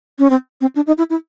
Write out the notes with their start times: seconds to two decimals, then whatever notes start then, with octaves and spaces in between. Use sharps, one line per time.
0.19 C#4
0.30 C4
0.61 C4
0.76 D4
0.87 D#4
0.98 E4
1.10 E4